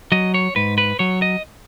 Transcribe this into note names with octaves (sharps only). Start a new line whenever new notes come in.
F#3 D#5
C#5
G#2 B4
B4
F#3 C#5
D#5